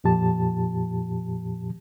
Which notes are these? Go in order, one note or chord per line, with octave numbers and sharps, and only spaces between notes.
F2 A#2 F3 G4 A5